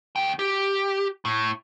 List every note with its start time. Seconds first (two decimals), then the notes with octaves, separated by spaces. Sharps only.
0.16 D#2 G5
0.39 G4
1.25 A2